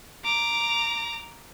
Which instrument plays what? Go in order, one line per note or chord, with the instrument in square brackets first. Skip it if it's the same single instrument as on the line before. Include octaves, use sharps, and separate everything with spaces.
[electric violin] A#5 D6